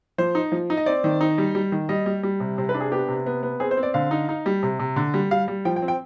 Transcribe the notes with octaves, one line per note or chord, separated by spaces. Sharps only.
F3 C5
D#4
F3
D#4
D#5
C4 D5
D#3
D#4
G3
G3
D#3
G3 D#5
G3
G3
C3
C3 C5
B4
D4
G#4
B3 G4
C3
B3
B3
C4 G#4
C5
C4
D5
D3 F5
D#4
D#4
G3
C3
C3
D3
G3
G3 F5
G3
F3 G5
G5
C4
G5